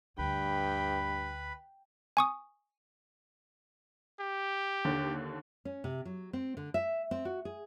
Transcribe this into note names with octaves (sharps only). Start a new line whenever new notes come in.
D2 G2 B4 G5 B5
G#5 C#6 D#6
G4
D#2 D3
C#4
C3
F#3
C4
D3
E5
C4
F#4
G#4